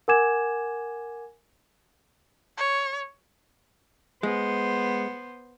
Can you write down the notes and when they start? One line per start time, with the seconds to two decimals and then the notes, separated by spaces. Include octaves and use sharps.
0.08 A#4 F#5 G#5 D6 G#6 E7
2.58 C#5
4.23 G#3 B3 C5